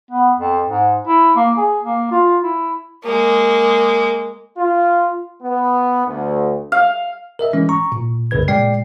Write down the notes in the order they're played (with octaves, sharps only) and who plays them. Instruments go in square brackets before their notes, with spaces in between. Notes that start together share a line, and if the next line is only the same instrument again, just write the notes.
[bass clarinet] B3
F2
G#2
E4
A#3
G#4
A#3
F4
E4
[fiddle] G#3 A#3
[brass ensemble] F4
B3
D2
[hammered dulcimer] F5
[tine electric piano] A#4 D#5 E5
E3 G#3 C#4
A#5 C#6
A#2
C2 F#2 C#3 B4 G#6
A#2 G#3 D5 G5 C7